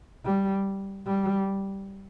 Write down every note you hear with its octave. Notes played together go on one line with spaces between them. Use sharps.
G3
G3